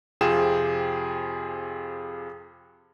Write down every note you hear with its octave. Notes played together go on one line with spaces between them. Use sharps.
F2 C3 F4 G#4 G5 E7